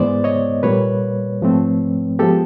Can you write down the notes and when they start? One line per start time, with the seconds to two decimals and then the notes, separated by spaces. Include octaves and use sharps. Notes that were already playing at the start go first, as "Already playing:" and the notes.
Already playing: G#2 E3 G#3 B3 C5 D5
0.24 C#5 D#5
0.63 A#2 G3 A#3 B4 C#5
1.41 G#2 F3 A3 C4
2.19 F3 G#3 B3 G4 A4